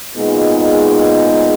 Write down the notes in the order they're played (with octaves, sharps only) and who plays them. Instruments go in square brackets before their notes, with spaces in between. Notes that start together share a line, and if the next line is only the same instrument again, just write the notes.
[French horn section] A#2 G#3 B3 D#4 G#4